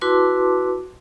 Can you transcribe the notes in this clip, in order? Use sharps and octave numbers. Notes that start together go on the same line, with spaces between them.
E4 F#4 B4 A5 C6 D6